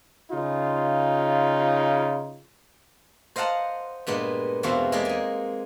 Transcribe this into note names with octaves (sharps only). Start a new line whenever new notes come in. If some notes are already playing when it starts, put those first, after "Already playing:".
C#3 D#4 F4
C5 D#5 F5 F#5 A5 A#5
G2 A#2 G#3 B3
E2 B2 C4 F4 E5
G#3 A#3 G4 G#4 D5
D#4 G#5